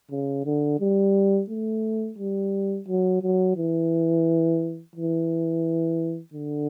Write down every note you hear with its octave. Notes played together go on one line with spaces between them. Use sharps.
C#3
D3
G3
A3
G3
F#3
F#3
E3
E3
D3